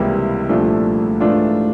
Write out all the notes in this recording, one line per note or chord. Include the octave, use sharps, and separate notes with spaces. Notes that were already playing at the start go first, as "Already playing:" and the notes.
Already playing: C#2 C3 E3 G3 A#3 E4
C2 A#2 F3 A3 D4
G#2 E3 A3 D4 F4